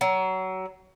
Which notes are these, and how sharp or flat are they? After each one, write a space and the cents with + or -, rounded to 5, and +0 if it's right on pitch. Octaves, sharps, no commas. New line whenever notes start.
F#3 +25